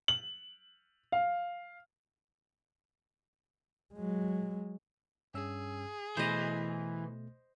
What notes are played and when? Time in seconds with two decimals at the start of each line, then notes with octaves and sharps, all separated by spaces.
0.08 F#7
1.12 F5
3.94 F#3 G#3
5.34 G2 C#4 G#4 E6
6.17 B2 E3 A3 C5 D#5